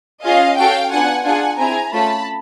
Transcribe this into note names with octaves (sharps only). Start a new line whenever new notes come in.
C#4 F4 G#4 D#5 F5
C#4 F#4 A4 F5 G5
B3 D4 F4 F#5 G#5
D4 F4 G#4 F#5 G#5
C4 E4 G#4 G#5 A#5
A3 C#4 F4 A5 B5